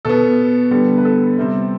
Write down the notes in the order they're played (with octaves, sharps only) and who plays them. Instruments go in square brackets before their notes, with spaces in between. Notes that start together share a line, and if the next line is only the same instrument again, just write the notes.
[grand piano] B2 B3 A4
D3 G3 B3
B4
A4
C3 G3 C4